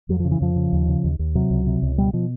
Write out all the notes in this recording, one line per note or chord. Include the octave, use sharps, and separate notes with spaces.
F2 F#3
C#3 F3
E3
F2 F3
C#3
D#2
C#3
D#2
D#2
C3 F#3
C#2
C3
C#2
B2 G3
B2 F3